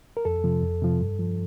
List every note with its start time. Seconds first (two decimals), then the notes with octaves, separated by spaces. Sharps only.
0.17 A#4
0.25 F2 A4
0.44 C3 F3
0.62 F2
0.82 C3 F3
1.01 G2
1.19 F3